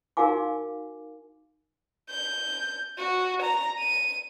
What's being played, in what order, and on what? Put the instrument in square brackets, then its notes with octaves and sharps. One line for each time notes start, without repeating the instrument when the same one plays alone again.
[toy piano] D#4 F#4 A#4 F5 G#5 D6
[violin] G6
F#4
A#5
D#7